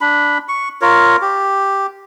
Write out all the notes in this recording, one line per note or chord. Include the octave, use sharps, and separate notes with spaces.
D4 B5
C#6
F4 A#4 C#5
G4